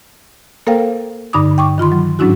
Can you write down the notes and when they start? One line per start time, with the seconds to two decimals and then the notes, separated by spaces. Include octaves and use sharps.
0.67 A#3 A4 A#4 C5 F5 G5
1.33 G2 D3 D#4 B5 D6 D#6
1.58 G5 C#6 D6
1.78 D#3 F4 B5 C6
1.92 F#3
2.19 G#2 F#3 C#4 D4 E4 F#4